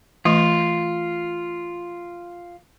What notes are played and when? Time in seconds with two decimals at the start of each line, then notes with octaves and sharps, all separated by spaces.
0.25 E3 A3 F4